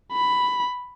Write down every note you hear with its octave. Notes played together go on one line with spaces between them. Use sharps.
B5